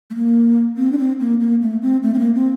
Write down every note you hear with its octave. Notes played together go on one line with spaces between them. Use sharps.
A3
A#3
C4
D4
C4
A#3
A#3
A3
C4
A3
C4
A#3
C4